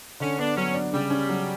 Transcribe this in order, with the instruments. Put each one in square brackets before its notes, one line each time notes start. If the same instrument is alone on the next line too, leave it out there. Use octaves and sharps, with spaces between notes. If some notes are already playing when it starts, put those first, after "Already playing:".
[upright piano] D3 [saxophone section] C#4
[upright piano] B3 [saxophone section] D4
[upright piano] F#3 [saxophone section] C#4
[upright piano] D4
[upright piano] C#3 [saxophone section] G3
[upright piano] C#4
F#3